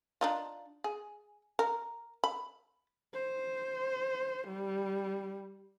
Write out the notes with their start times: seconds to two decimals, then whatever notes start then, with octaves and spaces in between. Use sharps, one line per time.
0.21 D4 D#4 F4
0.84 G#4
1.59 A#4
2.24 B5
3.14 C5
4.48 G3